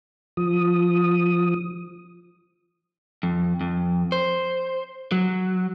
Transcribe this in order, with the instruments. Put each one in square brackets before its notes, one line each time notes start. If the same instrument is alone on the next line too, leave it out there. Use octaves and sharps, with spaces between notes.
[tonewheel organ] F3 D#6
[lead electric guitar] F2
F2
C5
F#3